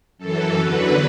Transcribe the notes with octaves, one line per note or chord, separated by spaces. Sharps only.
F#2 E3 A4
E2 D3 F#3 B4